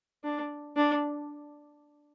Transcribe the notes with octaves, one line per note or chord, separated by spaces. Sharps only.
D4
D4